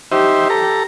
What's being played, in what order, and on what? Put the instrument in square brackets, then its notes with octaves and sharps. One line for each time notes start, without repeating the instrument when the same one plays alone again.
[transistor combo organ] D#4 C5 E5 [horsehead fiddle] G4
[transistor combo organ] A4 A#5